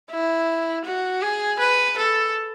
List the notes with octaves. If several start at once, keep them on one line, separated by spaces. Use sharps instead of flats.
E4
F#4
G#4
B4
A4